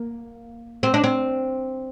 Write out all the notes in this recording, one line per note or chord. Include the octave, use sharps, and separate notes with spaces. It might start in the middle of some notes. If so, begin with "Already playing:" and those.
Already playing: A#3
C4
D4
C4